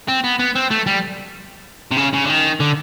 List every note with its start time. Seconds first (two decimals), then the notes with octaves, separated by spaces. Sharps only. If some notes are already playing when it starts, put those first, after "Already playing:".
0.08 C4
0.24 B3
0.40 B3
0.55 C4
0.71 A3
0.86 G3
1.92 C3
1.97 C#3
2.14 C#3
2.24 D3
2.29 D#3
2.60 D3